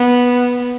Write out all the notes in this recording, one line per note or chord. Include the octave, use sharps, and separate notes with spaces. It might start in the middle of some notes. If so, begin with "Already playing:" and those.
Already playing: B3